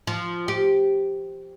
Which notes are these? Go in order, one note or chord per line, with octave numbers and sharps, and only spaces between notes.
F3
G4